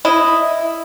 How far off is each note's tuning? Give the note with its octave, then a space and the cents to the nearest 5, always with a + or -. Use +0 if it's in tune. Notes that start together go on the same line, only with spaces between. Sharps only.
E4 +0 D#5 +0